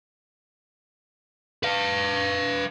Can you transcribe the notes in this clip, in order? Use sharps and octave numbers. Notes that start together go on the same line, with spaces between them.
B4 F5